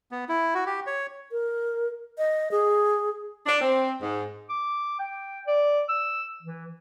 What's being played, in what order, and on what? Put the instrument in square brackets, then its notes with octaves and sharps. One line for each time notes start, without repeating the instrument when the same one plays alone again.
[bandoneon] B3
E4
F#4
G4
C#5
[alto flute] A#4
D#5
G#4
[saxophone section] D4
C4
G#2
[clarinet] D6
G5
D5
E6
E3